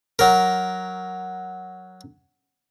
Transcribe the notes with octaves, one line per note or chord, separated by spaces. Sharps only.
F#3 A#4